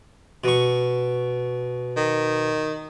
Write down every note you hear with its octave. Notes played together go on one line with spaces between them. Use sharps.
B2 C#6
D#3